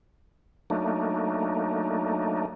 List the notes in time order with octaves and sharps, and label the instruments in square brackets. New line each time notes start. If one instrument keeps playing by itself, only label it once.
[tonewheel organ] F#3 A3 A#3 D4 D#4